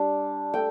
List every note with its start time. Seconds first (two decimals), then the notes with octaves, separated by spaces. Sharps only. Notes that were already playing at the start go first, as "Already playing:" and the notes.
Already playing: G3 D4
0.54 A3 G5